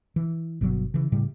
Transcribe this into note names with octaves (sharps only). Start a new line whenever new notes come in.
E3
G1 B2 D3 F#3
C#3 E3
A2 C#3 G3